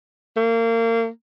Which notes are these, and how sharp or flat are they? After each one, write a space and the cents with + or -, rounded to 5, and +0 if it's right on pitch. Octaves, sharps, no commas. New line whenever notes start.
A#3 -30